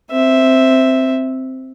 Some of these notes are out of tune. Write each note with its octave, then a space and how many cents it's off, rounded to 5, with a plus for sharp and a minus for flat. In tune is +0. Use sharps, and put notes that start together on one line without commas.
C4 +0 E5 -5